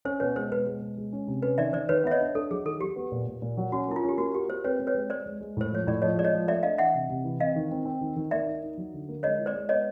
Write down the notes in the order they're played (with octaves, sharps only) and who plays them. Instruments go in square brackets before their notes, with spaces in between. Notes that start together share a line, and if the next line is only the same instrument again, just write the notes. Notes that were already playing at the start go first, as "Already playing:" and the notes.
[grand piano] C#4 [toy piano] C5
[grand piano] B2 [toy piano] B4 C#5
[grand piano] G#3 [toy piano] C5
[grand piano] B2 [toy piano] B4
[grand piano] G#3
B2
G#3
C#4
C3
[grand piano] C#4 [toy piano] B4
[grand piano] D#3 [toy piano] D5 E5
[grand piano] D#3 [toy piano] C5 D5
[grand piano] D#3 [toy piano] B4 C#5
[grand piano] B3 [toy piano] E5
[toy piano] C#5 D#5
[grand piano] D4
[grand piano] D4 [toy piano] A4
[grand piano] F#3 [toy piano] G#4
[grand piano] D#3 [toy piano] A4
[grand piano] F#3 [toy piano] G4
[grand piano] B3
A#2
A#2
A#2
F#3
[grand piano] C#4 [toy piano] F#4
[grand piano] A#3 [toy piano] E4
[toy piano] F4
[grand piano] C#4
[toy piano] G4
[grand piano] A#3 [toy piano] F#4
[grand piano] F#4 [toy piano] G4
[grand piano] A#3 [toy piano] C5
[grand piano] C4 [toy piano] B4 C#5
[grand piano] C4
[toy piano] B4 C#5
[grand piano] G#3
[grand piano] G#3 [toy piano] C5 D5
[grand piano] G#3
G#3
[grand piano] A2 [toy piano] C5
[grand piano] F3 [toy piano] C#5
[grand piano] A2 [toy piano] D5
[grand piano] F3 [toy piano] C#5 D#5
[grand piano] G#3 [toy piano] D5
[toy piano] C#5 D#5
[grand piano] F3
[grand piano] A3 [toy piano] D5 E5
[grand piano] D4 [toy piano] D#5 F5
[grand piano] E3 [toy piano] E5 F#5
[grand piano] C3
C3
E3
[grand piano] C4 [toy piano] D#5 F5
[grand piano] D#3
C4
C4
D#3
D#3
[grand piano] A#3 [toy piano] D5 E5
[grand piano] D#4
D#4
F#3
D3
A#3
[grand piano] G#3 [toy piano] C#5 D#5
[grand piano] E4
[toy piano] C5 D5
[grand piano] G#3
[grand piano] B3 [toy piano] C#5 D#5